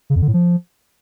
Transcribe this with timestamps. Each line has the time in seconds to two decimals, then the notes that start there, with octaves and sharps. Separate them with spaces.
0.10 C#3
0.16 F2
0.22 D3
0.28 A2
0.34 F3